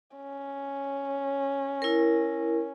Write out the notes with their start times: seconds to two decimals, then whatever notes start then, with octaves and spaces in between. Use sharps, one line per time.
0.16 C#4
1.82 E4 A#4